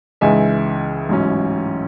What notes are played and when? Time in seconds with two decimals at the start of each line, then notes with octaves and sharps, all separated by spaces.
0.21 C#2 C#3 E3 G#3 D#4 E5 G#5
1.09 A1 G#2 F#3 C#4